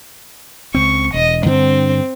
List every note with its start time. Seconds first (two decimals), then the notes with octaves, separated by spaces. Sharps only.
0.74 C#2 C4 C#6
1.14 E1 D#5
1.46 G2 D3 C4